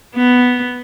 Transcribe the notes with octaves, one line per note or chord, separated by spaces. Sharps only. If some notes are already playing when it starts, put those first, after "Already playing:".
B3